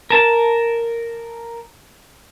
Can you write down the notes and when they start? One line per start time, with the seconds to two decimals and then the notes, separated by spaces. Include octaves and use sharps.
0.10 A#4 A5